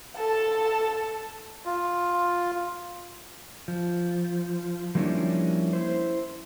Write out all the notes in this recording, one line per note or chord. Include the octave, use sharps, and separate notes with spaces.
A4 A5
F4
F3
F3 G3 A#3 C#4 D4 E4
E4 C5